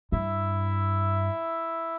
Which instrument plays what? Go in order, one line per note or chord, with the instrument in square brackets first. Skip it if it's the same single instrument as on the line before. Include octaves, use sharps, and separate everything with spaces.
[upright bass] G2 [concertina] E4 E5